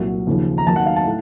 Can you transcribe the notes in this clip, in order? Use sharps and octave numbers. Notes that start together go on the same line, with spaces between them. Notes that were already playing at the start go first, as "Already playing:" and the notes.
Already playing: C2 A#2 F#3
D#2 C#3 F3
A#5
D#2 D#3 F#3 A5
F#5
F5
A5
A2